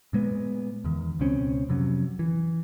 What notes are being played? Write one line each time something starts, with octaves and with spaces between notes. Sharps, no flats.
A#2 G#3 B3
E2 D#3
C#2 B2 C4 C#4
F2 C3 F#3 C#4
E3